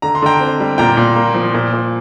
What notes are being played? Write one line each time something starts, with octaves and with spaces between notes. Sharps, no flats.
D3 A#5
C6
D3 G5 A#5
C4
G3
A#2 G5 A#5
A#2
A#3
F3
A#2
A#2